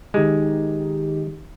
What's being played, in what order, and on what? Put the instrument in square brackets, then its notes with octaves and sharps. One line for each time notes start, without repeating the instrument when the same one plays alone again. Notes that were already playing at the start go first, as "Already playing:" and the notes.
[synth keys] D#3 D#4 G4 [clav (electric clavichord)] G#3